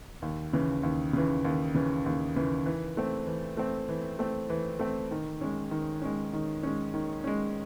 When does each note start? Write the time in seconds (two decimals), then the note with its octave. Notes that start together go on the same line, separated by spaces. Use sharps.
0.22 D#2
0.53 C#3 E3
0.83 D#2
1.13 C#3 E3
1.45 D#2
1.75 C#3 E3
2.06 D#2
2.36 C#3 E3
2.66 E3
2.97 A3 C4
3.27 E3
3.57 A3 C4
3.89 E3
4.19 A3 C4
4.50 E3
4.79 A3 C4
5.11 D#3
5.41 G#3 C#4
5.71 D#3
6.02 G#3 C#4
6.33 D#3
6.63 G#3 C#4
6.94 D#3
7.24 G#3 C#4